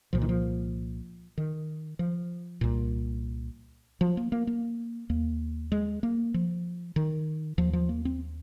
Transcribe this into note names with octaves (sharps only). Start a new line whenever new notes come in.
C2 A#2 F3
D#3
F3
D#3
F3
C2 A#2
F3
A#3
A#3
A#3
D#2 A#3
G#3
A#3
F3
D#3
D#2 F3
F3
A#3
C4